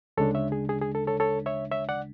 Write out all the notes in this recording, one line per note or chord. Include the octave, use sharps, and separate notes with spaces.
D2 C#3 G#3 D4 A4 C#5
C#5 E5
G#4
G#4
G#4
A4
A4 C#5
A4 C#5
C#5 E5
C#5 E5
D5 F#5